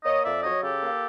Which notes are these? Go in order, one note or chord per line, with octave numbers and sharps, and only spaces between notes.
A#3 C#5 D#5
F2 D5 E5
F#3 C#5 D#5
C#3 G4 A4
A#3